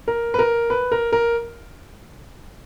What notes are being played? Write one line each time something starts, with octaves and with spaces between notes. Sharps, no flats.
A#4
B4
A#4
B4
A#4
A#4